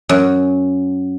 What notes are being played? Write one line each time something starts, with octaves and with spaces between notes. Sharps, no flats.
F#2